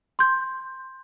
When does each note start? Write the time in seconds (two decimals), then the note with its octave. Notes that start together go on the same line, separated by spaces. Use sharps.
0.19 C6 G6